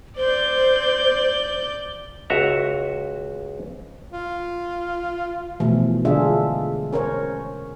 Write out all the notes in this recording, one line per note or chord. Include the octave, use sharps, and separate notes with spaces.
C5 D5 G6
C#2 F#4 E5 A#5
F4
B2 E3 F3 A3
D3 G#3 D4 F4 G#4 E5
C#4 A#4 C5 C#5